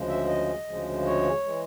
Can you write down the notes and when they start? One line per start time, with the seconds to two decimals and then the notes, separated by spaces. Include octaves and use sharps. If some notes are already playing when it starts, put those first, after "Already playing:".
Already playing: D2 C#3 F3 G#3
0.09 E5
0.28 D#5
0.67 D2 C#3 F3 G#3
1.06 C#5
1.44 E3 G#3